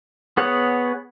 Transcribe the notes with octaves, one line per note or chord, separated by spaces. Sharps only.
B3 G#4 C#5 F#5